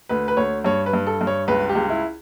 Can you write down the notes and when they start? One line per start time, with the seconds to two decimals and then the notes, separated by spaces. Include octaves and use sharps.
0.09 D2 B4
0.28 B4
0.37 D2 C#5
0.64 G2 C#5
0.86 B4
0.93 G2
1.07 A4
1.21 G2
1.27 C#5
1.48 C#2 B4
1.69 G4
1.75 C#2
1.90 E4